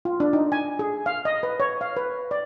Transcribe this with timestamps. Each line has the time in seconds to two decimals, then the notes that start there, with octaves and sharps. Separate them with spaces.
0.05 F4
0.20 D4
0.33 D#4
0.52 G#5
0.79 G#4
1.06 F5
1.25 D#5
1.43 B4
1.60 C#5
1.81 F5
1.97 B4
2.31 D5